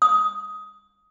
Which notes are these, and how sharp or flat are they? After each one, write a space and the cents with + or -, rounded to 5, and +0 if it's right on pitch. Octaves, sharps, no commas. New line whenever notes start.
D#6 +15